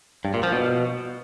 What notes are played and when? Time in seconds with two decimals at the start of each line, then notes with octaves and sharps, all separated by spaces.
0.25 G2
0.34 A#2
0.43 F3
0.52 B2